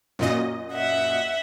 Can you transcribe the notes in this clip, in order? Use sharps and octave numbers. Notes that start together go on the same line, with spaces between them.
F#2 A#2 D#5
E5 F#5